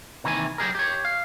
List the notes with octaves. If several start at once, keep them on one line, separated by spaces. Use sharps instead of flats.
C3 D#3 E3 A#3 G#5
F#3 G4 G#4 A#4
G4 C#5
F5